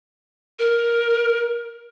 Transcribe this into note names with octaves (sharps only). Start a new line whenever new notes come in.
A#4